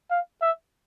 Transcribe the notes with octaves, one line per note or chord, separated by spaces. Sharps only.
F5
E5